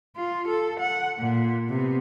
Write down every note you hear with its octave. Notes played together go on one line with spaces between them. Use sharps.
F4
A4
F#5
A#2
C3 B3